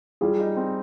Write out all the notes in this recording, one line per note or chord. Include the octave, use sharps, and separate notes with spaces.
G3 F4 G#4
D#4
C4